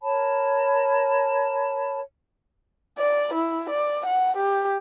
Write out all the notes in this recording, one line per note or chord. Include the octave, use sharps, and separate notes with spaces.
A#4 C#5 A5 B5
D5
E4
D5
F#5
G4